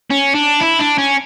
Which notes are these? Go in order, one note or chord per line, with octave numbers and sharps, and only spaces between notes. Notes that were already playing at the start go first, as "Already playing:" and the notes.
C#4
D4
E4
D4
C#4